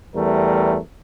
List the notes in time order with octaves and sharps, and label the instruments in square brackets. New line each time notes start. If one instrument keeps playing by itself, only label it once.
[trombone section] E2 G3 A3 A#4